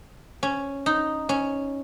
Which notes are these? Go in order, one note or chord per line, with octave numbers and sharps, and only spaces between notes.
C#4
D#4
C#4